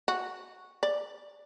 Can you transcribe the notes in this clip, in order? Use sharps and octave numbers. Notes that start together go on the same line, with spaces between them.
F#4
D5